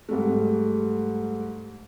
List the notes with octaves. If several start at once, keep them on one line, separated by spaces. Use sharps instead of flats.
G#2 G3 A3